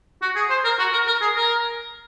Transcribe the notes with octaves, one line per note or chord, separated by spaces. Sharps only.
F#4
G#4
C5
A#4
F#4
A#4
A#4
G#4
A#4